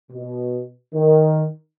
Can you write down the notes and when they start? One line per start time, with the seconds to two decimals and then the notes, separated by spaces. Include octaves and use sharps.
0.11 B2
0.93 D#3